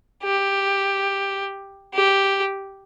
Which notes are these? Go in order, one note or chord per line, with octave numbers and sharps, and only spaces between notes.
G4
G4